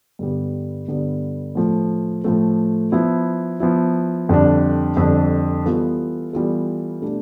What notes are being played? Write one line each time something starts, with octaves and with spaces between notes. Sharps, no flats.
G2 D3 G3 B3
G2 D3 G3 B3
A2 F3 A3
A2 F3 A3
F3 B3 E4
F3 B3 E4
F2 D3 G3 D4
F2 D3 G3 D4
E3 G3 B3 F4 A4
E3 G3 B3 F4 A4
B2 A3 D4 G4